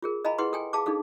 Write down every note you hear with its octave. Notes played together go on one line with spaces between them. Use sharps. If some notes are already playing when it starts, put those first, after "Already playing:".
F4 G#4 A#4
D#5 F5 G#5 A#5 B5
E4 G#4 B4 F#5 C6
A4 G5 G#5
G#4 F5 A5 D6
D4 D#4 G#4 A4 F5